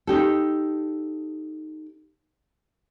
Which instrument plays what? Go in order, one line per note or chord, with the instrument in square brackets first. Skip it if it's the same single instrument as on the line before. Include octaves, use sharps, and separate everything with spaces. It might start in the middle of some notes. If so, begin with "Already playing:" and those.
[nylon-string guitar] D#4 G4 A4